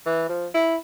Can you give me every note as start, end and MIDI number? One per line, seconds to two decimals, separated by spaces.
0.06 0.28 52
0.29 0.47 53
0.54 0.76 64